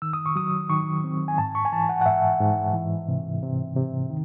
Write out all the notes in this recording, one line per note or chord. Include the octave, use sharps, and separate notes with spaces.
D#3 E6
D#6
C#6
F#3 D#6
D#3 C#6
C4
G#5
G#2 A5
C#6
G#5
E3 A5
F#5
F#5
G#2 E5
G#2
E3
C3
C3
C3
D#3